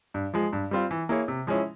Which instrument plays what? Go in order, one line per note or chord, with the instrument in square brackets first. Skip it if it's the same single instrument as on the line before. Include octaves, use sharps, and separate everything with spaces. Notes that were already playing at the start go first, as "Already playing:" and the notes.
[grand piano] G2
F3 G#3
G2
G3 C4 F4
E3
A#3 E4 G#4 C#5
C3
F3 G#3 C#4 E4